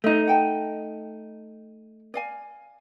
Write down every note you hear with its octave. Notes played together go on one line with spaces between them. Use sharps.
A3 D#4 D#5
F#5 G5 A5
D5 F5 G#5